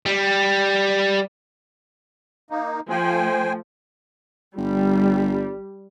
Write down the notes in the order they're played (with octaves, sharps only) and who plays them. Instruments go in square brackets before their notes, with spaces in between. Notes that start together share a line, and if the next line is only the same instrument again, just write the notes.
[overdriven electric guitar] G3
[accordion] A#3 D#4
[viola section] F3 A3 [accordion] C5 G5 G#5
[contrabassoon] G1 [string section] G3